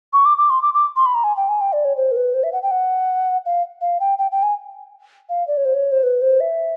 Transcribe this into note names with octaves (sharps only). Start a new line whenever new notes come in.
C#6
D6
D6
C6
D6
D6
C6
B5
A#5
G#5
G5
G#5
G5
D5
C#5
C5
A#4
B4
C5
E5
F#5
G5
F#5
F5
F5
G5
G5
G5
G#5
F5
D5
C#5
C5
C#5
C5
B4
C5
E5